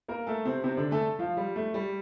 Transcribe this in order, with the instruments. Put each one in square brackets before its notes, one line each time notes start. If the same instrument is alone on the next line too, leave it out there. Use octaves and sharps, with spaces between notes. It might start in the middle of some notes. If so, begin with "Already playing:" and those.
[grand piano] A#3 A#4
A3 A4
C3 C4
C3 C4
D3 D4
A3 A4
F3 F4
G3
A3
G3